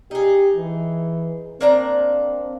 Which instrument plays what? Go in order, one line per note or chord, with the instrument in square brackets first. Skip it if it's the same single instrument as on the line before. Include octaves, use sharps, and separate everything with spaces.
[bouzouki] D#4 G#4 [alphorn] G4
[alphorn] E3
[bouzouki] A#3 D4 A#5 [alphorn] C4